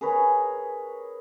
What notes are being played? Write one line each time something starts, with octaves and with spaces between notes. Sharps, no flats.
G#4 A#4 B4 C#5